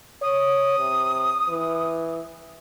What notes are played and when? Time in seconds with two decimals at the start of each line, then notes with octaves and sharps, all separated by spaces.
0.22 C#5 D#6
0.79 C3
1.49 E3